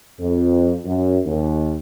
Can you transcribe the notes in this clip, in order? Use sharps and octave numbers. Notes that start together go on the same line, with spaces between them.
F2
F#2
D#2